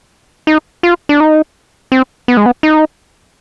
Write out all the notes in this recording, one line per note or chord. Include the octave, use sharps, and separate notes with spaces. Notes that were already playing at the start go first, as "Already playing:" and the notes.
D#4
F4
D4
D#4
C4
B3
G#3
B3
D#4